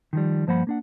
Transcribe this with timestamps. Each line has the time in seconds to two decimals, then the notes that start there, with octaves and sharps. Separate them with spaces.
0.13 D#3 F3 G3
0.47 G2 F3 A#3 C5 F#5 B5
0.67 A#3 D4 F#5